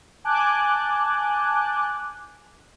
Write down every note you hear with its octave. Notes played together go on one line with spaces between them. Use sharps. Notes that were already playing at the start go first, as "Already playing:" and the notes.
G#5 A5 D6 F#6 G6